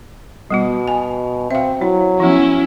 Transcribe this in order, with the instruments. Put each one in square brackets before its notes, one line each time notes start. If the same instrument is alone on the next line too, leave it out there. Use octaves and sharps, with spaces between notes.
[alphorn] B2 [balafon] G3 B3 F#4
[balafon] G#5
[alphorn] C4 [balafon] E5 F5
[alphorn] F#3 [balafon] E4
[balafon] F3 B3 [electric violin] C#4 E4